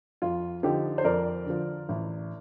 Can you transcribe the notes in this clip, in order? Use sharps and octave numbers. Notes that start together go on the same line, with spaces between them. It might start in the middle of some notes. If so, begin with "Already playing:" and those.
F2 F4
D3 F3 D#4 G4
C5
F2 A#4 D5
D3 F3
A1